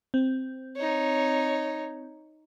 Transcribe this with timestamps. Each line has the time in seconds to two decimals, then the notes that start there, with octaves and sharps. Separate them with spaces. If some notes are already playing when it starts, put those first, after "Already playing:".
0.14 C4
0.76 D#4 C#5